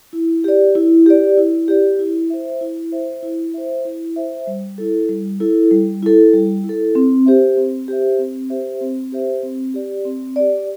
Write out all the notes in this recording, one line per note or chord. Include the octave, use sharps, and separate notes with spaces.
E4
G4 D5
E4
G4 D5
E4
G4 D5
E4
C5 E5
E4
C5 E5
E4
C5 E5
E4
C5 E5
G3
E4 A4
G3
E4 A4
G3
E4 A4
G3
E4
A4
C4
G4 C5 E5
C4
G4 C5 E5
C4
G4 C5 E5
C4
G4 C5 E5
C4
G4 D5
C4
G4 D5